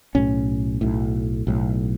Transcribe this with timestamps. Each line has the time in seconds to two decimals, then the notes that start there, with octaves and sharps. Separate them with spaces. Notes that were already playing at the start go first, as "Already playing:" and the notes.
0.15 B1 A2 C#4
0.81 B1 A2
1.47 B1 A2